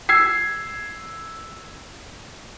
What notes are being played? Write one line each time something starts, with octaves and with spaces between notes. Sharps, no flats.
E6 G#6 C7